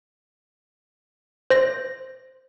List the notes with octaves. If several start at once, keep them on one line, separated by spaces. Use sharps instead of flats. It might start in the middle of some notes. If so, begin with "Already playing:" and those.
C5 A#6